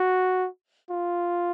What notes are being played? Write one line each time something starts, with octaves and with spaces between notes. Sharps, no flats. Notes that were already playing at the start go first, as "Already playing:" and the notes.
Already playing: F#4
F4